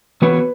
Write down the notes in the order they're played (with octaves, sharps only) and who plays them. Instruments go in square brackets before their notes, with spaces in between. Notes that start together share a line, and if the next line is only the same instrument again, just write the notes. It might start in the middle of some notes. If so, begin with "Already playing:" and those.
[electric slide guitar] E3 B3 F#4 C#5 [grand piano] B4